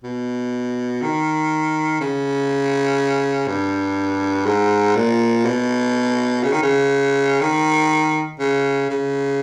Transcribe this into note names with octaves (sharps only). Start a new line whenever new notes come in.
B2
D#3
C#3
G2
G#2
A#2
B2
C#3
D#3
C#3
D#3
C#3
C#3